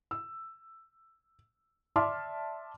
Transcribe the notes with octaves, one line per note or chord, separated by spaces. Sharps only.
E6
D5 E5 A5 C6 D6 F6